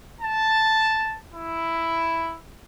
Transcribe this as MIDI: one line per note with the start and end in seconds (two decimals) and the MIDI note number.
0.19 1.15 81
1.32 2.36 64